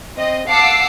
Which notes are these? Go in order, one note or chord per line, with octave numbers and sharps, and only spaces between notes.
C4 D#5
F5 F#5 A5 D6 E6 C7